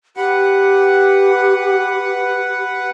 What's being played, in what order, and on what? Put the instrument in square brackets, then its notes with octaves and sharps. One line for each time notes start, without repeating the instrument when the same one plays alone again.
[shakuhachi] G4 [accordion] B4 F#5